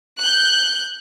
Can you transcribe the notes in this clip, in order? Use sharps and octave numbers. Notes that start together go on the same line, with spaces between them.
F#6 G6